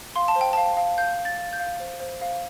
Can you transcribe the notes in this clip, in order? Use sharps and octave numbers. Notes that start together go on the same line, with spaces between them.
F5 C6
A5
C5
G5
F5 A5
F5
F5 G6
F5
A6
F5
G6
F5
C5
C5
F5